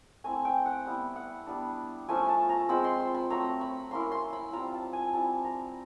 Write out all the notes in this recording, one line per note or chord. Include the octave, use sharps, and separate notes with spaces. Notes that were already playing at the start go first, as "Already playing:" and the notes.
A3 C4 E4 G#5
G5
F#5
G3 B3 E4
F#5
G3 B3 D4
F3 A3 C#4 G#5
A5
A#5
G#3 C4 F4 B5
C6
C6
B5
F#3 A3 C4 A#5
B5
F#3 A#3 C#4 E4 C6
C6
B5
G3 C4 F4 A#5
A5
G#5
G3 C4 E4 A5
A#5